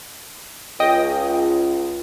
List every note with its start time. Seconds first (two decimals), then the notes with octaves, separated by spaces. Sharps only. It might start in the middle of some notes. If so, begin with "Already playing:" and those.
0.80 C#2 D#5 G5 D#6